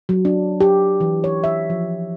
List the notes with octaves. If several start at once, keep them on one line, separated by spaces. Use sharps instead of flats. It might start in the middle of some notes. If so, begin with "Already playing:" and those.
F#3
D4
G4
E3
C#5
E5
F3